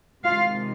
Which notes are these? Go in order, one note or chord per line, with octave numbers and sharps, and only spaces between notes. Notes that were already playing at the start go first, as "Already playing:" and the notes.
C3 D#3 G#3 F4 F5